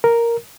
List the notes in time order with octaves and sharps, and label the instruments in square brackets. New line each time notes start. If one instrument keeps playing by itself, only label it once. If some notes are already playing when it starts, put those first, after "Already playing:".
[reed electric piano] A#4